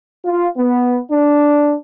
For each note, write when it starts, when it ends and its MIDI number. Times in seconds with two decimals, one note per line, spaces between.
0.25 0.47 65
0.57 0.98 59
1.11 1.73 62